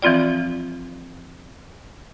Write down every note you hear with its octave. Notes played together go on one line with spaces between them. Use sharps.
E3 F3 C4 F4 D5